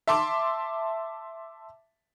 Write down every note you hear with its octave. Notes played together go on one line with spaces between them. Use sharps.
E5 A5 C6 D6